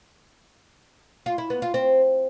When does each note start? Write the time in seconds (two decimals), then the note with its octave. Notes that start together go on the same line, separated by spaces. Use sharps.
1.26 F4
1.38 E4
1.50 B3
1.62 F4
1.74 C4